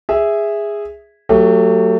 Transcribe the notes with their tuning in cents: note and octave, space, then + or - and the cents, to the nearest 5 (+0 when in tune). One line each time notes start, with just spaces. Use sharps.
G#4 -10 E5 +0
F#3 +0 A3 +30 G4 +0